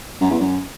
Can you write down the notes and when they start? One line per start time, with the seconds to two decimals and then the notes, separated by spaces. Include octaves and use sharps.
0.20 F#2
0.31 E2
0.40 F#2